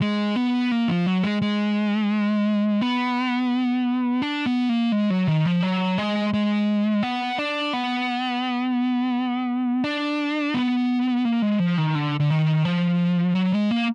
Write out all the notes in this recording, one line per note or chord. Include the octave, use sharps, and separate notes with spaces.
G#3
B3
A#3
F3
F#3
G#3
G#3
B3
D4
B3
A#3
G#3
F#3
D#3
F3
F#3
G#3
G#3
B3
D4
B3
D4
B3
A#3
G#3
F3
D#3
D3
D3
D#3
F3
F#3
G#3
A#3